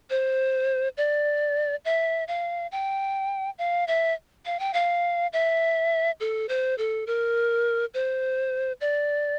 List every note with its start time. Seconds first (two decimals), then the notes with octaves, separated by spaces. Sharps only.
0.10 C5
0.97 D5
1.85 E5
2.28 F5
2.72 G5
3.58 F5
3.88 E5
4.46 F5
4.59 G5
4.74 F5
5.33 E5
6.20 A4
6.49 C5
6.78 A4
7.07 A#4
7.94 C5
8.81 D5